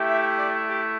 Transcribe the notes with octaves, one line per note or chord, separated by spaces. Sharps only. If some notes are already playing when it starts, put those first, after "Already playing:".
Already playing: A3 E4 G4
E5
D5
G4